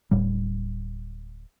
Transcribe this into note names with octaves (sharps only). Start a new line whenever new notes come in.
D1 A2 G3